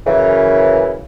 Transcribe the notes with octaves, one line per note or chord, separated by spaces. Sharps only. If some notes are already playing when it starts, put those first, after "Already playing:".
F#2 C#3 E3